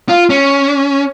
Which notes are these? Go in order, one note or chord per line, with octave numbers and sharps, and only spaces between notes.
F4
C#4